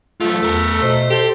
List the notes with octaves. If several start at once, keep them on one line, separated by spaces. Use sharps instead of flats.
F#3 A3 F4
E2 A4 A#4
B2 C5
G4 A4